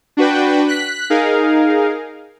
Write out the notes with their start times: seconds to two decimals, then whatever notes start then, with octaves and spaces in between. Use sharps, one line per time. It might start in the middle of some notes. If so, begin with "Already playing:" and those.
0.17 D4 F#4 B4 G5
0.68 F#6 B6
1.10 D#4 G#4 A#4 F5